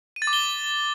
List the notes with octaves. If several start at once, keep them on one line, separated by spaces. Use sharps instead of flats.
D#7
A6
D6
G7